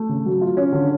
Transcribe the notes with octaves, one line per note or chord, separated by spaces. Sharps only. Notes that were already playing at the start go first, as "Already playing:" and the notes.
Already playing: A3
C#3
F#3
F4
C#4
D3